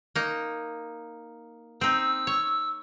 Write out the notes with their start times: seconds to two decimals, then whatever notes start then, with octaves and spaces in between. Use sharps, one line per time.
0.16 A#3 D#4
1.81 C4 D#4 E6
2.27 C#5